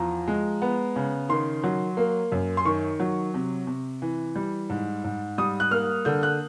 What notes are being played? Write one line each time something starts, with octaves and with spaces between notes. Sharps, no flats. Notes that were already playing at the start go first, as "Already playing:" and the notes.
Already playing: E2 F3 A#5
G#3
B3
C#3
D#3 C6
F#3
A#3
F#2
C6
D#3 C#6
F#3
C3
C3
E3
G3
G#2
G#2
G3 D#6
F#6
A#3 F6
D3 G6
F#6